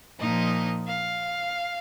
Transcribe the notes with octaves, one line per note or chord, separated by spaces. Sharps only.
A#2 F3 A#3 D#4 D#5
F5